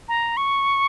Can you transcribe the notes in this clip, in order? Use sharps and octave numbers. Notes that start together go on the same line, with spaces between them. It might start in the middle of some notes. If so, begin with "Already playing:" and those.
A#5
C#6